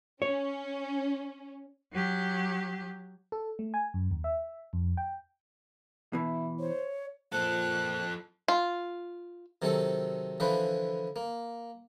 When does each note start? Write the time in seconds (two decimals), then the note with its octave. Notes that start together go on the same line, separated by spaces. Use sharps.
0.22 C#4 C#5
1.93 F#3 G4
3.32 A4
3.59 A3
3.74 G#5
3.94 F#2
4.11 D#2
4.24 E5
4.73 F2
4.97 G5
6.13 B2 E3 E4
6.60 C5 C#5
7.32 A#2 F3 A4 C5 F#6
8.48 F4
9.62 C3 D#3 F#3 C4 A4
10.40 D3 E3 F3 B4 C5
11.16 A#3